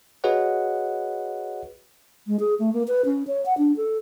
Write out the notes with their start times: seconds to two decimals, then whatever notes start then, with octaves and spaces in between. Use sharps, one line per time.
0.24 F#4 G#4 B4 C#5 D#5 F#5
2.27 G#3
2.40 G#4
2.59 A3
2.73 A#3
2.88 B4
3.05 C#4
3.27 C#5
3.46 F#5
3.58 D4
3.77 A4